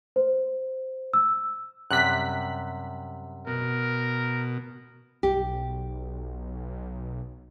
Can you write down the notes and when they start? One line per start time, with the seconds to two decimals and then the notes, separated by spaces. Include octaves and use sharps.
0.16 C5
1.13 E6
1.91 F#2 C3 G3 F#6 B6
3.47 B2 A#4
5.23 B1 G4